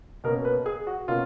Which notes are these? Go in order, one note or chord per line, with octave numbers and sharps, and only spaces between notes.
B2 A#3 C#4 A#4
B4
G#4
F#4
B2 A#3 C#4 F4